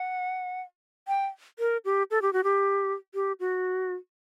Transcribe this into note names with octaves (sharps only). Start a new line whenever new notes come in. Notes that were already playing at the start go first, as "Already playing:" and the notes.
Already playing: F#5
G5
A#4
G4
A4
G4
F#4
G4
G4
F#4